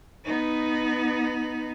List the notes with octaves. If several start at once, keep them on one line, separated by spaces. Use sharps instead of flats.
B3 D#4